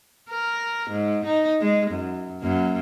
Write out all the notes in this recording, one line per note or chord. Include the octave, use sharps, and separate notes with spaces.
A#4
G#2
D#4
G#3
F#2
F#2 A#3